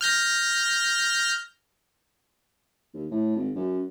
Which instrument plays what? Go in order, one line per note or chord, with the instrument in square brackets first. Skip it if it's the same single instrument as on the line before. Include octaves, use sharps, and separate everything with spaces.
[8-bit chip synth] F6 G6 A#6
[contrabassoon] D#2
A2
G#1
F#2